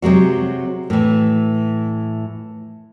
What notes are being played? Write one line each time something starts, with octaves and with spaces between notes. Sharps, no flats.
C3 F#3 G#3 F#4
A2 E3